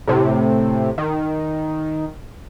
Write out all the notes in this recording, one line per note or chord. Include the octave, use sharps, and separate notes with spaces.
A2 C3
D#3